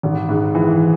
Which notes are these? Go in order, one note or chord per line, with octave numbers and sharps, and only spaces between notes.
G#1
G#2
E3